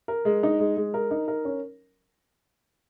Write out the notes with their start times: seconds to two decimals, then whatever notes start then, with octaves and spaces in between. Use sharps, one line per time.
0.08 A#4
0.25 G#3
0.43 D#4
0.60 G#3
0.77 G#3
0.94 A#4
1.11 D#4
1.28 A#4
1.45 C#4